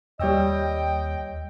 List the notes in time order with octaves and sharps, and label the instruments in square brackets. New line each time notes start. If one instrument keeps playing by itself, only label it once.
[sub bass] D#2 [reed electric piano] G3 C#5 E6 [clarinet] D#5 [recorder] G5